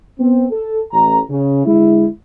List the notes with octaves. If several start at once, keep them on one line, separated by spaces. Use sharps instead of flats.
B3 C4
A4
A1 A#5
C#3
D3 G#3 E4